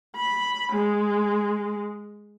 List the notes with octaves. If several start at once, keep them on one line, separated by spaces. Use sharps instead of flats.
B5
G#3